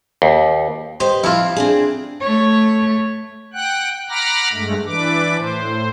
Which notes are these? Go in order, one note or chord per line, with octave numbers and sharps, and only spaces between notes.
D#2
G4 B4 C5 D#5
F3 C4 E4 F4
C4 D4 G#4
A3 C#5
F#5 G5 F#6
F#5 A#5 B5 D6 F6 A#6
G2 G#3 A3
E3 D4 B4 D6
A2 C5